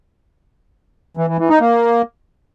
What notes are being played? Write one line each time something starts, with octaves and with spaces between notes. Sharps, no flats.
E3
E3
E3
D#4
A#3